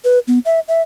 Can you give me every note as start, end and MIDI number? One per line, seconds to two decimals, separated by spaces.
0.05 0.19 71
0.28 0.39 59
0.45 0.60 76
0.68 0.82 76